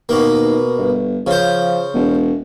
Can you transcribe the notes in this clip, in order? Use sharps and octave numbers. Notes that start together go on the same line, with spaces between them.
D#2 B2 A#3
G1
C#3 F3 C5
E1